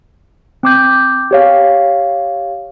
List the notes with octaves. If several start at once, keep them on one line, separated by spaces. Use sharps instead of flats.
C4 D6 G6
G4 C#5 F5